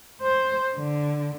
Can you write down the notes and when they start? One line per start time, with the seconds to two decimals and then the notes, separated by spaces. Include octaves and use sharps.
0.21 C5
0.76 D3